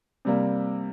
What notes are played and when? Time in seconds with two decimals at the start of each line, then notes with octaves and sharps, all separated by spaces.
0.25 C3 G3 A#3